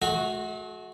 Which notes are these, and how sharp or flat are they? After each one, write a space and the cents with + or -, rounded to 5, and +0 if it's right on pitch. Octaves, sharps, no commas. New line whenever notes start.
A3 -45 F#4 -5